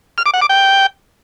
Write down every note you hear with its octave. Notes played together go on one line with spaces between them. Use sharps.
F6
D6
F#5
D6
G5